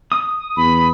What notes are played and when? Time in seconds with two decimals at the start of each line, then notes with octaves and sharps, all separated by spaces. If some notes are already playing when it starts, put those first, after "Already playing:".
0.12 D#6
0.57 E2 B5